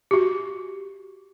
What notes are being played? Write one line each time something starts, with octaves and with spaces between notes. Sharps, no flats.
F#4 G4